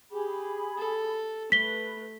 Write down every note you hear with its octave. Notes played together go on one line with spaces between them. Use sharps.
G4 G#4 B5
A4
A3 B4 B6 G7